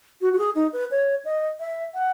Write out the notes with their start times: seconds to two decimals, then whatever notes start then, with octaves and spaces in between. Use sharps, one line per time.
0.21 F#4
0.33 F#4
0.38 G#4
0.55 D#4
0.73 B4
0.91 C#5
1.25 D#5
1.60 E5
1.94 F#5